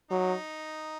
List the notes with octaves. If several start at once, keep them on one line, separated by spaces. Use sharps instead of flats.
F#3 D#4